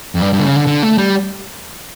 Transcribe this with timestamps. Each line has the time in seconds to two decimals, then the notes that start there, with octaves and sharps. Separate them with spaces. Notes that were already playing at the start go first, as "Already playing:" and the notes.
0.15 F2
0.22 G2
0.33 G2
0.39 D3
0.44 C#3
0.56 D3
0.67 D3
0.83 A3
0.98 G3